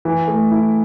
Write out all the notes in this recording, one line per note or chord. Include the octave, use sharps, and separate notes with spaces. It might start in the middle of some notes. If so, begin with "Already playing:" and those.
E3
A3
E4